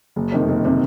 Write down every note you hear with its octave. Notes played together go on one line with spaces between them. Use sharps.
F#1
F2 C3 D#3
F#1
C3 D#3